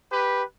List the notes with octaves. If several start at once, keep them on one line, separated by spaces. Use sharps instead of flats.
G4 B4